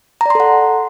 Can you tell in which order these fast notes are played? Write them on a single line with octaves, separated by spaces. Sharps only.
A#5 D5 C6 A4 F#5